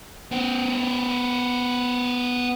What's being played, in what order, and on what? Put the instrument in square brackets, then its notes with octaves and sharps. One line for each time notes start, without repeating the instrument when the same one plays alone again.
[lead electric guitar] B3 C5